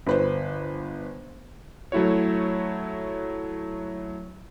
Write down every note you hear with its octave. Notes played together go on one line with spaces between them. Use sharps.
G1 B4 C5
F#3 A3 E4 F#4 C#5